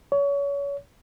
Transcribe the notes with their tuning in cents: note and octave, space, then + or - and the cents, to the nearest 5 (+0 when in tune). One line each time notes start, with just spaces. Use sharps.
C#5 +30